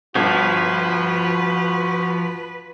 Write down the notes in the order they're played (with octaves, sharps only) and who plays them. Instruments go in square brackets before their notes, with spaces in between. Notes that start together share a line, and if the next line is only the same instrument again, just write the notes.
[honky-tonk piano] G1 [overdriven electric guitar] F3 [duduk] F#4 [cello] B4